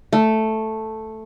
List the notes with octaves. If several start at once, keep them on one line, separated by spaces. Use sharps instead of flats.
A3